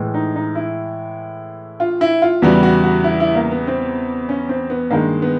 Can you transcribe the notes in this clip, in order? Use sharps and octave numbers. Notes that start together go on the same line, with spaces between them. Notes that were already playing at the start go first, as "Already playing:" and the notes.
Already playing: A2 E3 G#3
D#4
D#4
E4
F4
E4
F4
E2 C#3 E3 G3 F#4
F#4
F#4
E4
E4
A#3
B3
C4
C#4
C4
B3
G2 D#3 G#3 A#3
B3